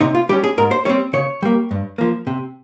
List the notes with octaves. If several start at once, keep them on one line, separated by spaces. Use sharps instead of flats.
C3 D#4
F4
G3 C#4 G4
G#4
G#2 A#4
C5
G3 C4 C#5
C#3 C#5
G3 A#3
G2
F3 A#3
C3